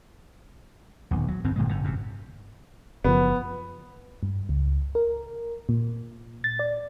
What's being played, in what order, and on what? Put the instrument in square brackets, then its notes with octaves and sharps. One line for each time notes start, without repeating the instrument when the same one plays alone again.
[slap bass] D#1 B1
F#3
G1 G2 C4
G1 A#2 G#3
G1 A2 D3
G1 F#2 C3
[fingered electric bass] F#1 A#2 F3 [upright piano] B3
[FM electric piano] G2
C#2
A#4
A#2
A6
D5